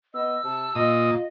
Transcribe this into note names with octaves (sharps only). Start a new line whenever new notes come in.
B3 D#5 E6
C3 A5
A#2 F4 D#5 D#6